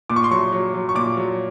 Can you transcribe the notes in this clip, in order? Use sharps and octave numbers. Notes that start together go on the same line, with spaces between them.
A#2 D6
C#6
C6
F#3 C#6
F#3
F#3
C#6
A#2 D6
F#3